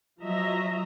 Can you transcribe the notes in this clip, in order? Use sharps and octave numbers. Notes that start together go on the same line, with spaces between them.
F3 F#3 D#5 E5 A#5